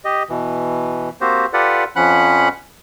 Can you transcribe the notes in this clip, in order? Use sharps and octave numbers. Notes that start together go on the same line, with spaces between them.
G4 D#5
B2 E3
A#3 C4 F#4 G4 C5
F4 G4 A4 B4 D5 F#5
F2 F3 C#4 F#5 B5 F#6